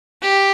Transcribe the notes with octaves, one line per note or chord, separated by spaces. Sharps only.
G4